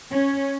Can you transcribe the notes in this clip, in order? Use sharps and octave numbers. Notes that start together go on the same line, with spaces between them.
C#4